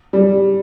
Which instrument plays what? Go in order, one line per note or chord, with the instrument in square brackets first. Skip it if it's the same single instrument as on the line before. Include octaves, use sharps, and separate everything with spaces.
[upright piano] G3